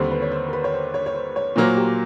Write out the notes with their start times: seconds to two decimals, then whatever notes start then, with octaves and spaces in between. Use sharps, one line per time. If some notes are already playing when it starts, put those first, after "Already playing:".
Already playing: D#2 D3 G3 C4 C5
0.11 B4
0.22 C#5
0.32 C5
0.48 A#4
0.53 B4
0.64 C#5
0.74 C5
0.94 C#5
1.06 C#5
1.14 C5
1.36 C#5
1.56 A#2 F#3 A#3 C5
1.77 G4